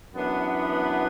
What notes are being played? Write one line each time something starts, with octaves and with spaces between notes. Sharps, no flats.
F#2 E3 B3 D4